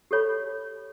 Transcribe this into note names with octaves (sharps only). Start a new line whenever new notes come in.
G4 A4 C#5 B5